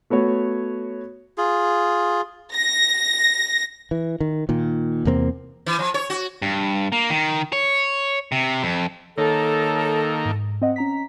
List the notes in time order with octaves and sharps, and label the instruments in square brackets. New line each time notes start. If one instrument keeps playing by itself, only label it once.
[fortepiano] A3 B3 F#4 C#5
[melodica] F4 G#4
[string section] A#6
[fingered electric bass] E3
D#3
A#2 D#3
E2 C3 A#3 C4
[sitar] E3
F3
C#5
F#4
[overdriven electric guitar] G2
A#3
D#3
C#5
C3
F2
[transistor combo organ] D#3 A#3 [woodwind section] A4 [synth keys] C#5
[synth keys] G#2
C4 D#5 F#5
C#4 A#5 B6